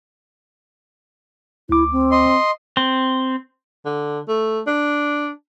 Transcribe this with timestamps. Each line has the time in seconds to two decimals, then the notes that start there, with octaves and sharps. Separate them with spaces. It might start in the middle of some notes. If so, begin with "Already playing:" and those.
1.69 D2 E4 D6
1.92 C4
2.11 D#5 C6
2.77 C4
3.85 D3
4.29 A3
4.67 D4